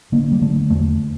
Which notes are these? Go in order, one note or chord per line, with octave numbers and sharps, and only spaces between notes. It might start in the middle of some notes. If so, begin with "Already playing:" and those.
D3 A#3
G3
D3 A3
E2 A3